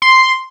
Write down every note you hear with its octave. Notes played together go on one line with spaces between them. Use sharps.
C6